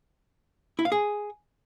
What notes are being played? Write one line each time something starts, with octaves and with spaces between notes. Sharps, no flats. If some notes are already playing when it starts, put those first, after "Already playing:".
E4
F5
G#4